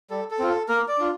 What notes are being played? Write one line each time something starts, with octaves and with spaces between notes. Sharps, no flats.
G3 A4
A4
C4 F4
A4
A#3 A#4
D5
D4 F4